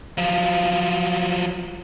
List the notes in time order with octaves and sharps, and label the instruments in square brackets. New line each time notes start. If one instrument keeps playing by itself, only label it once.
[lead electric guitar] F3 F#3